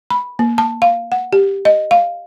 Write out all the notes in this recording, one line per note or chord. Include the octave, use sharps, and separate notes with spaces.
B5
A#3
A5
F5
F#5
G4
D#5
F5